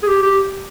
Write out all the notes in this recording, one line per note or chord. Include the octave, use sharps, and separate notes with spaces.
G#4
G4
G4